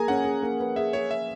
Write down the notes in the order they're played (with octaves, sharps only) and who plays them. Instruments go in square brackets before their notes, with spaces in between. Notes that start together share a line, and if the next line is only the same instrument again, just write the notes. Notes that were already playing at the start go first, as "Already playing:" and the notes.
Already playing: [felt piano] A#3 G#4 [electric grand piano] G#5 A#5
[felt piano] C#4 [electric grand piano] F#5
[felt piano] G#4
A#3
B4
[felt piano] G#4 [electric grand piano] E5
[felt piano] G#4 [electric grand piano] C#5
[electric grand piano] E5